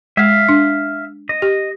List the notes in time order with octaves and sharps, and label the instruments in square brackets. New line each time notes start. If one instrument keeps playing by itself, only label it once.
[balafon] G#3 [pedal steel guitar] E5 F5
[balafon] D4
[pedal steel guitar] D#5
[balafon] G4